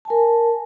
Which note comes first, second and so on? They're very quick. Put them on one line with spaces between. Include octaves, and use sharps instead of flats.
A5 G#5 A#4